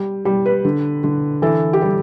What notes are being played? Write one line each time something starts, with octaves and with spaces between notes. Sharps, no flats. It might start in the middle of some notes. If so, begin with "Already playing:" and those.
Already playing: G3
G3
B4
D3
D3
E3 A4
G4
G3 A4